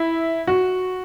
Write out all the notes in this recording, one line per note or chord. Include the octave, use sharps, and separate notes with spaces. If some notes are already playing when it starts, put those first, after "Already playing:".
Already playing: E4
F#4